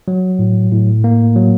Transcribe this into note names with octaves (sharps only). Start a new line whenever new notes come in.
F#3
A2
A2
A#3
F#3